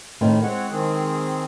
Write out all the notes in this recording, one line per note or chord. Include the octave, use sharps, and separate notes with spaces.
A2 D#3 C4
G#3 C4 C#5 F#5
D#3 C4 G#4